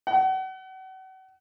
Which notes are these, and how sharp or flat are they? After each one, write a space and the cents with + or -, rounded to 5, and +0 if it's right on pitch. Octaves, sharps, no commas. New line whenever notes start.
F#5 +35